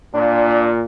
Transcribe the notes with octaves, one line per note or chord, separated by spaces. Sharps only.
A#2 D4